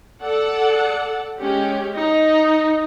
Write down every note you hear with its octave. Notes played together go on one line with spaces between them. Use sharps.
A4 D5 F#5
G#3 C#4 G4
D#4